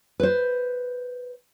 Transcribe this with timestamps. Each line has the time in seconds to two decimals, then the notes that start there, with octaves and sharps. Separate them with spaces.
0.20 B4 C5